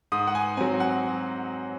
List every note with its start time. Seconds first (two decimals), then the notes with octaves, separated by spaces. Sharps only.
0.12 G#2 D#6
0.27 F#5
0.35 G#5
0.57 C4 G#5
0.61 F#3
0.80 F#5